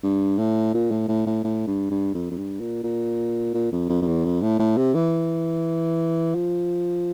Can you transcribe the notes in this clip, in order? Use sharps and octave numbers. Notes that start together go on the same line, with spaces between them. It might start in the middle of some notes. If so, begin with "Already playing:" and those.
G2
A2
A#2
A2
A2
A2
A2
G2
G2
F2
F2
G2
A#2
A#2
A#2
F2
F2
F2
E2
F2
A2
A2
C3
E3
F3